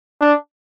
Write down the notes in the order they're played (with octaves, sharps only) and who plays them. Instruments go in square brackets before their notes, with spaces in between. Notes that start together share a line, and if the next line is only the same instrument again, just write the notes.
[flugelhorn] D4